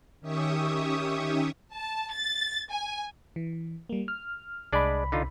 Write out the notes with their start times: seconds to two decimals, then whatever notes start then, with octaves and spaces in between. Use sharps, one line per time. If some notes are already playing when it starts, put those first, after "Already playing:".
0.21 D#3 C#4 G4 E5 C#6 D#6
1.74 A5
2.12 A6
2.70 G#5
3.36 E3
3.89 G3 A#3
4.08 F6
4.73 C2 G#3 D4 D5 B5
5.12 D3 D#4 F4